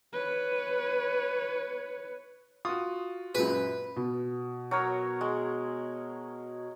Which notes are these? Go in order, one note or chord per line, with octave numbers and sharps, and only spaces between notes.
B4 C#5
F4 F#4 D#6
F#2 A#2 G#3 B4
B2
F#3 A#4 C#5
G#3